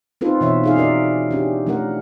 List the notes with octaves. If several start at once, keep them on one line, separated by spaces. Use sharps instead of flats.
C4 D#4 F4 A4 B4 C5
B2 E3 C#5 E5
D#4 G#4 F5
C#4 F#4 A#4 D5 E5
C#4 D4 G4
F3 A3 C#4 A#4 F#5